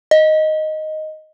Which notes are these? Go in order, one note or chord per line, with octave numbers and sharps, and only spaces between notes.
D#5